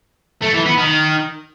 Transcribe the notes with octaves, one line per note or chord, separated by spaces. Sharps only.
A3
E3
B3
D#3